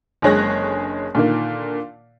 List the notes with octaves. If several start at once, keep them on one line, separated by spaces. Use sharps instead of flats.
F#1 D3 G#3 C#5 F#6 A#6
A#2 D3 D#3 A#3